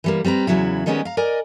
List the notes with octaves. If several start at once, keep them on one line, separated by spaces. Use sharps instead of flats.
E3 G3 A#3
G3 C4 B4 A#5
E2 A#2 C#3 F#3 E4
D#3 G3 G#3 B3 C#4 A#4
F5 A#5
A#4 D5 D#5 G#5